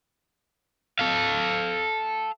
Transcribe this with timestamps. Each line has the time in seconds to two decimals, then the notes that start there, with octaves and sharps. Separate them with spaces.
0.99 A4 F5